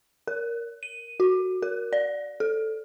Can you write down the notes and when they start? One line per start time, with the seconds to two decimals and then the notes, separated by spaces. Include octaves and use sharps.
0.28 A#4
0.83 D#7
1.20 F#4
1.62 A#4
1.93 D5
2.40 A4